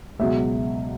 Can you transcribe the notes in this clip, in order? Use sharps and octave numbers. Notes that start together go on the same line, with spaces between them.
C#2 B2 F#3 E5